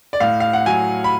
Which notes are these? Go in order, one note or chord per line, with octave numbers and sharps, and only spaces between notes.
D5
A2 F5
F5
F#5
F#3 G#5
B5